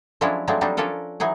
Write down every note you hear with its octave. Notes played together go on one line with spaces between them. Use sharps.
F3 F#3 G#3 C#4 D4 E4
F3 F#3 G#3 A3 C4 D4
F#3 G3 C4 D4 D#4
F3 C#4 D4 F4 A4 A#4
E3 F#3 D#4 G#4